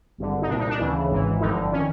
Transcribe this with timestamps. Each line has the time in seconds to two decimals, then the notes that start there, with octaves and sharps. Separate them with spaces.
0.18 G#1 G2 D3
0.42 D#4
0.48 C2 D4
0.51 A#2
0.59 D#4
0.69 D4
0.79 D2 C#3 E3
1.10 G#1 G#2 E3
1.40 G1 F2 D3 D#4
1.72 D#3 C#4